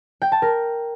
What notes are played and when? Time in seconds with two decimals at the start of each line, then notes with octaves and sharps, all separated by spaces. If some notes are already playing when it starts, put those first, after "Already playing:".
0.22 G5
0.32 A5
0.42 A#4